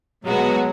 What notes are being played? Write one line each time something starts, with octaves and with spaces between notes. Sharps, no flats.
B2 F#3 G#3 B3 F#4